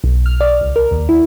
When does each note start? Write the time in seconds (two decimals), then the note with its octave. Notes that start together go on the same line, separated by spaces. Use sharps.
0.04 B1
0.26 F6
0.41 D5
0.61 C#2
0.76 A#4
0.91 D#2
1.09 E4